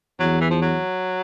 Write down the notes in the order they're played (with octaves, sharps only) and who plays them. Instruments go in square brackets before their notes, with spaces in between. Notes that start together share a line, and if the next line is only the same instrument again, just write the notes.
[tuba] E2 [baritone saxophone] F#3
[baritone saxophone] E3
F3
F#3